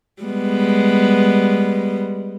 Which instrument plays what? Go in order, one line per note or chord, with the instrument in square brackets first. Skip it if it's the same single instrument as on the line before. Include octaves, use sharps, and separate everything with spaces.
[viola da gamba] G3 G#3 B3